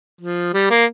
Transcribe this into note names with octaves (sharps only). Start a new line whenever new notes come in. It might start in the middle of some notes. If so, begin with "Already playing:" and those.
F3
G3
A#3